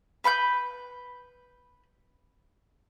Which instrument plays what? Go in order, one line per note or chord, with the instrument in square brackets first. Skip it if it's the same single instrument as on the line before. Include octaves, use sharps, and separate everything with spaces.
[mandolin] B4 B5 C#6 G6